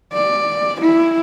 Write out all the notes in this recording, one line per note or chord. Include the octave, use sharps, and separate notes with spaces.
D5
E4